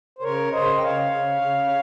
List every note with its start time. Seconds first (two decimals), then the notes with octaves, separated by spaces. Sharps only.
0.19 C5
0.22 C#3 A#4 C#5
0.52 C#3 C5 D#5
0.78 G5
0.82 C#3 C#5 F5
1.12 C#3
1.42 C#3